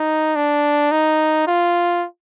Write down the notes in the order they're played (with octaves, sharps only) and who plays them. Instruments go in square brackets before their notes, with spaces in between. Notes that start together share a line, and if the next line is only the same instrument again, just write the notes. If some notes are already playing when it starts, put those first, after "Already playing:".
Already playing: [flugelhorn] D#4
D4
D#4
F4